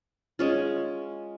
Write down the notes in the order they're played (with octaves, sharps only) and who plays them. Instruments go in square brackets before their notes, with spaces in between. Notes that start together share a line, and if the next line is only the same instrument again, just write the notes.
[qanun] G#3 C#4 F4